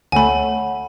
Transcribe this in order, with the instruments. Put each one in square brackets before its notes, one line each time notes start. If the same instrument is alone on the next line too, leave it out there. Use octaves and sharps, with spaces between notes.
[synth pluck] D2 A3 [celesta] A4 C#5 F#5 [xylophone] G#5 B5